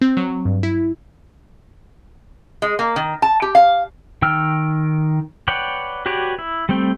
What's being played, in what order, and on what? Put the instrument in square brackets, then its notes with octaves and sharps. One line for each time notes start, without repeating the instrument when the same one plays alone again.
[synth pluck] C4
F#3
G2
E4
[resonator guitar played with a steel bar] G#3
A#3
D#3
A5
G4
F5
[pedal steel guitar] D#3 G5 E6 F6
B4 C#5 D5 F#5 G5
F#4 G4 B4 C#5 D5
E4
G3 A3 C4 G5